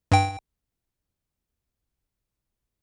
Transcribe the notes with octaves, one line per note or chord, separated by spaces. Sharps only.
G2 G5